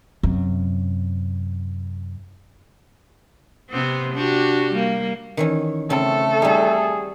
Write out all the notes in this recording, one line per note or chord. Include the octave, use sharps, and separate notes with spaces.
F#2 C3
C3 B3 C4
D4 F#4 G4
G3 A#3
D#3 E3 C#4
C#3 A3 C4 A4
G3 D#4 G#4